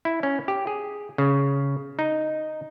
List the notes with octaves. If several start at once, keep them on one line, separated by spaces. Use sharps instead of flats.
E4
C#4
G4
G#4
C#3
D#4